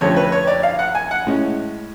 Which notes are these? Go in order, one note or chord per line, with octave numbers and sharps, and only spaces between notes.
F2 D3 F3 A3 C#4 C#5
B4
C#5
D5
F5
F#5
G#5
F#5
A2 G#3 C#4